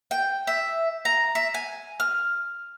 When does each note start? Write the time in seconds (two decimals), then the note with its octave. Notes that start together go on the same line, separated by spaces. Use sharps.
0.11 G5
0.47 E5
1.05 A#5
1.35 E5
1.54 G#5
2.00 F6